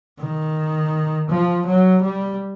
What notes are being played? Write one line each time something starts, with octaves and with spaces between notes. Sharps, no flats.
D#3
F3
F#3
G3